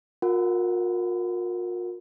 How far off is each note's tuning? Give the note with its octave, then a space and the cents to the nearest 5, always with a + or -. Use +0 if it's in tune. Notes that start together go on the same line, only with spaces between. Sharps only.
F4 +45 A#4 +0 F#5 +0